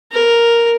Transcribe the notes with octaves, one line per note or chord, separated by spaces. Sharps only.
A#4